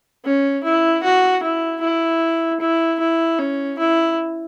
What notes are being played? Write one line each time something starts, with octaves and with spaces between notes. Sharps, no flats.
C#4
E4
F#4
E4
E4
E4
E4
C#4
E4